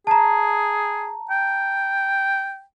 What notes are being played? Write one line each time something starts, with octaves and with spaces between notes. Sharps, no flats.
G#4 A5 A#5
G5